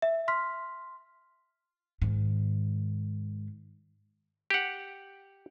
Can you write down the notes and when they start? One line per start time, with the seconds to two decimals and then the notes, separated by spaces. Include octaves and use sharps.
0.02 E5
0.28 C6 F6 B6
2.02 G#2 D#3
4.50 G4 F#5